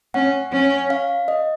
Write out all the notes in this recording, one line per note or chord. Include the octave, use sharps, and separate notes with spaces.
C#4 F#5
C#4
F5
D#5